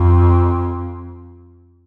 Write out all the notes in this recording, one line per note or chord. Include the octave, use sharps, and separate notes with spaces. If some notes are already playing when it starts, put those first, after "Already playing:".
Already playing: F2